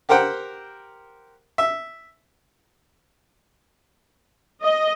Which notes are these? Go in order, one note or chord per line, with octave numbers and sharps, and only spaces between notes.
G4 A#4 C5 F#5 G5
E5
D#5